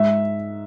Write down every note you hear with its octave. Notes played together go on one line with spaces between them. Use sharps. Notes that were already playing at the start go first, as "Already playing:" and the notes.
Already playing: G#2 E5